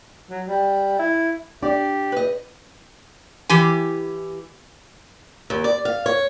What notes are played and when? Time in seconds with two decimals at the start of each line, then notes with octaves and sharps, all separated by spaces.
0.30 F#3
0.47 G3
0.99 E4
1.62 D4 G4 D5
2.12 B4 D#5
3.49 E3 G4 G#5
5.50 D#2
5.64 D5
5.85 F5
6.06 C#5